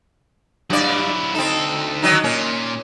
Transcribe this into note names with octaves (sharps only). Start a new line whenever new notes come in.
G2 F#3 E4 D5
D2 C4 D#4 A4
D#3 F#3 D#4
A#2 C#4